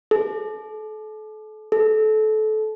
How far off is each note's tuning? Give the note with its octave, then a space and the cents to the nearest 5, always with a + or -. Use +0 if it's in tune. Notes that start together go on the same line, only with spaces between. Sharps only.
A4 -35
A4 -25